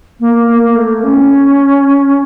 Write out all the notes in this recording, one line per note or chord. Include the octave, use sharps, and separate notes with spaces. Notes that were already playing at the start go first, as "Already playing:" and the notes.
A#3
A#3
A#3
A3
C#4